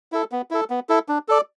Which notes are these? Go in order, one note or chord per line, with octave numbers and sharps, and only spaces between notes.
E4 A4
B3
E4 A4
B3
E4 A4
D4
A4 D5